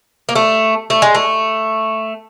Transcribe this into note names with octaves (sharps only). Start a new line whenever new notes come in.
A#3
A3
A3
G#3
A3